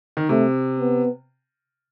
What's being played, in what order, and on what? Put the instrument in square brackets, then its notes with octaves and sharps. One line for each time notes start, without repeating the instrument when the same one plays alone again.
[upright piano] D#3
[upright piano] C3 [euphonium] A3
[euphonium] B3